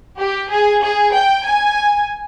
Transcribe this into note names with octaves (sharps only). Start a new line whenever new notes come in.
G4
G#4
G#4
G5
G#5